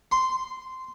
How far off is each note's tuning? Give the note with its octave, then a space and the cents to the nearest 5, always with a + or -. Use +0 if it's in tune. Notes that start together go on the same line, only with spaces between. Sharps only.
C6 -10